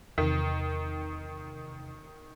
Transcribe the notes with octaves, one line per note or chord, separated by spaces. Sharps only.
E2 C3 D#3